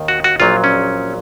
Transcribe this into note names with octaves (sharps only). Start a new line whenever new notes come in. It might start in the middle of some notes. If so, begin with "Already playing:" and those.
Already playing: D#2 D#3
F#4
F#4
A#1 A#2 F#3 F4
C#4